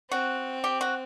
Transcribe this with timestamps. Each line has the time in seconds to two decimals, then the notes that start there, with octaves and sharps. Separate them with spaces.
0.11 C4 F#4
0.64 G4
0.81 F#4